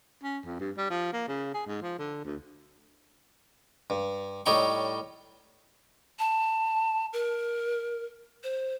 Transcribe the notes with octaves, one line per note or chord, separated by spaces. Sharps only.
C#4
F2
G2
G3
F3
A#3
C#3
G#4
G#2
F3
D3
D2
G2
A2 G3 D#4 C#5 G5 C#6
A5
A#4
C5